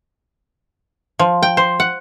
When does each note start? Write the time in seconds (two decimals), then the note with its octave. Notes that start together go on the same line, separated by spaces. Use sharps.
1.19 F3
1.43 G5
1.57 C5
1.80 F#5